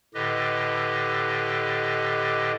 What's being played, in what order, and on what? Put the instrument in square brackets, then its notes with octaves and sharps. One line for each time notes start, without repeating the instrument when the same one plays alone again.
[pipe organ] A2 D3 G4 B4 D#5